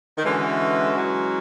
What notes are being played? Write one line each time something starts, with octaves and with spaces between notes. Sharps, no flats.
D#3
D3 E3 G#3 C#4 F#4
E3 F#3